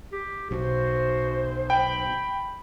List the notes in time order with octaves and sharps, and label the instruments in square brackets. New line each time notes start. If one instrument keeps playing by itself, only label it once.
[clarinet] G4
[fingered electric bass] B1 [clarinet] F#4 [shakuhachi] C5
[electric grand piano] G5 [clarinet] B5